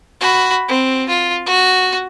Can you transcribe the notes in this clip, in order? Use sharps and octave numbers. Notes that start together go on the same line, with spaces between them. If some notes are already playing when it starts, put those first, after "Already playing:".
F#4 B5
C4
F4
F#4